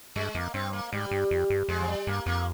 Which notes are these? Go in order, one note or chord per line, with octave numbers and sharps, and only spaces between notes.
G2 G#3
F2 A#3
G2 C4
A#3
G#2 G3
G2
F2
G2
F2 G#3
F3
G3
G2 A#3
F2 A#3